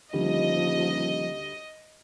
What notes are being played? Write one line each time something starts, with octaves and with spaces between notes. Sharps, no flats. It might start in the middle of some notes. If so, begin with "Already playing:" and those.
D#1 D2 F3 G3 D#5